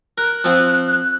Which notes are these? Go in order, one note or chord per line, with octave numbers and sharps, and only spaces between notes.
A#4 F#6
F3 C4